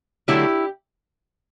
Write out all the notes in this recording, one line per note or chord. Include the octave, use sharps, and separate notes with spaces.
D3 F#3 A3 E4 G4